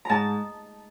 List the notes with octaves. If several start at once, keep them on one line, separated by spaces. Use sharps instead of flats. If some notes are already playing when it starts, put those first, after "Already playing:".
G#2 A5 A#5